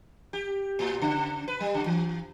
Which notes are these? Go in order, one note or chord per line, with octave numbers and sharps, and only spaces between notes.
G4
A2
C#3
B4
G3
C#3
E3